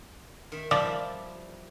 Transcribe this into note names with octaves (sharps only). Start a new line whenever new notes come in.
D#3 E5
F3 G3 G4 D5 E5